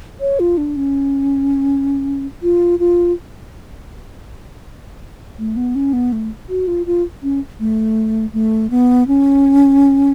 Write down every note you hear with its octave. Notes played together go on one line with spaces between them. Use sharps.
C#5
F4
D4
C#4
F4
F4
A3
B3
C#4
B3
A3
F#4
F4
F4
C#4
A3
A3
B3
C#4